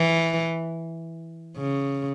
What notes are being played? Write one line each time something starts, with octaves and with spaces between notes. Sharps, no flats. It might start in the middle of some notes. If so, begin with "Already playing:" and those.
Already playing: E3
C#3